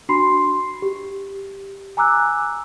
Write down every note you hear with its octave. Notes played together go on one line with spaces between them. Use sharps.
D4 F#4 B5 C6 C7
G4
G#5 A#5 D6 E6 F#6